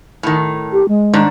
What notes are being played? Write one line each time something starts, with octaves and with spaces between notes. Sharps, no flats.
A2 D#3
G4
G#3
G#2 D#3 D4